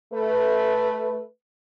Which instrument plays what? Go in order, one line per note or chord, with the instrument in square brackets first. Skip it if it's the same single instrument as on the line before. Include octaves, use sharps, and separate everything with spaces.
[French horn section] A3 B4